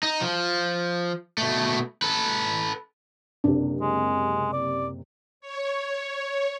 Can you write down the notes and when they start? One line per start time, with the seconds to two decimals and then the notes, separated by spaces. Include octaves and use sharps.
0.03 D#4
0.21 F3
1.38 B2 A3
2.02 A4 B4
3.44 F#1 C3 D4
3.81 G#3
4.53 D5
5.40 C#5